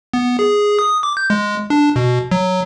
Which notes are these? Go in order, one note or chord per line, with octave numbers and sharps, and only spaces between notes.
B3
G#4
D#6
D6
G6
G#3
D4
B2
F#3